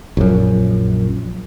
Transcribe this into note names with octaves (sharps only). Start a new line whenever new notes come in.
A#1 F#2